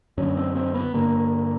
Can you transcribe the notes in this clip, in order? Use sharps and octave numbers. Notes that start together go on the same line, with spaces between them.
F#2 D3 C#4
C4
C4
B3
G2 D3 A#3